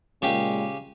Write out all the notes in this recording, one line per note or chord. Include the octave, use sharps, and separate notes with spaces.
A#2 C#3 G#3 G4